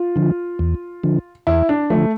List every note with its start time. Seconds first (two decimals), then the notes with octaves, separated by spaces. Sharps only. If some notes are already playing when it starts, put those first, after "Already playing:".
Already playing: F4
0.16 D3 F3
0.59 E2
1.04 D3 F3
1.47 E2 E4
1.69 D4
1.90 D3 F3 A3